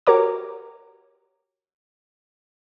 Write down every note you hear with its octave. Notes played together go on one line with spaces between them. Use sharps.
F#4 G4 A#4 C#5 A#5 D6